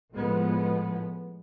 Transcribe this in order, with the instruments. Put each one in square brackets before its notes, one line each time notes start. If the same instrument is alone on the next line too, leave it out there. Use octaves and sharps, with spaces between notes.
[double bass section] A2 F3 G#3 B3